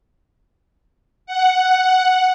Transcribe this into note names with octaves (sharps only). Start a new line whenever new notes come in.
F#5